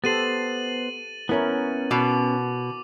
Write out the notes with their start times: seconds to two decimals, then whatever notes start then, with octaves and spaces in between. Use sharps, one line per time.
0.04 B3 G4 A4 C5 A6 D#7 F#7
1.29 B3 C#4 E4 A#4 C#5
1.91 B2 D6